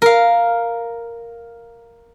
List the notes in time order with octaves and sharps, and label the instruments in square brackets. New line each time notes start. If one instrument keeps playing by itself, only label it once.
[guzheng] A#4 F5